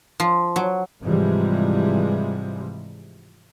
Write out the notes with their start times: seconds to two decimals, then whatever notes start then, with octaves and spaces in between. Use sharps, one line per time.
0.20 F3
0.56 F#3
1.01 G#2 C3 E3 F3 G3 G#3